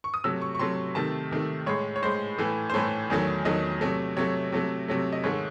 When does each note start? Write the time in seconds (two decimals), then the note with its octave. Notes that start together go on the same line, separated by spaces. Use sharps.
0.04 C#6
0.14 D#6
0.24 C3 F#3 A3 E6
0.42 C#6
0.55 C#6
0.59 C3 F#3 A3 C6
0.95 C3 D#3 A3 A5
1.31 C3 D#3 A3
1.67 A2 G#3 C#5
1.96 C#5
2.02 A2 G#3 C5
2.38 A2 E3 A3
2.70 C5
2.74 A2 E3 A3 C#5
3.10 E2 D#3 F#3 A3
3.45 E2 D#3 F#3 A3 D#5
3.81 C3 F#3 A3
4.17 C3 F#3 A3 C#5
4.52 C3 F#3 A3
4.88 C3 F#3 A3
5.13 D#5
5.24 G#2 D#3 A3 C#5